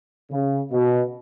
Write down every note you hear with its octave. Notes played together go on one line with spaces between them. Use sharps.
C#3
B2